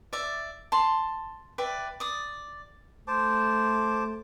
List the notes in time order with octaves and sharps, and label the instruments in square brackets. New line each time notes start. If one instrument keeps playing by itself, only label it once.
[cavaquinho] D5 E5
A5 C6
B4 D5 E5 G5
D5 D#6
[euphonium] A3 [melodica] C5 A5 D6